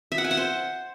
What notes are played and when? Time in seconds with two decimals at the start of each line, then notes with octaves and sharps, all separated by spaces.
0.12 E5
0.18 F#5
0.24 G#5
0.31 F#5
0.37 C5